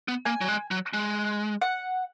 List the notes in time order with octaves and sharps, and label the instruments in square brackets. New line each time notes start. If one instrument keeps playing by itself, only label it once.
[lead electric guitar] B3
[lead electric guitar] A#3 [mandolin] G#5
[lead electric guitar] F#3
G#3
F#3
G#3
[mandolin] F#5